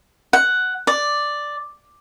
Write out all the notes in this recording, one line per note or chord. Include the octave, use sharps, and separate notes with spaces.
F#5
D5